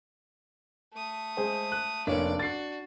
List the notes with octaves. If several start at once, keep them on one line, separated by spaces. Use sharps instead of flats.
A3 D#6
G#3 G#4 C5
F#6
F1 A#3 C#4 D4 C#5 D5
F#4 A6 C7